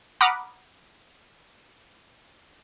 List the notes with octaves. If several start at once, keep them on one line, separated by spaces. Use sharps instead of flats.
F#5 A#5 B5 D6 D#6 F6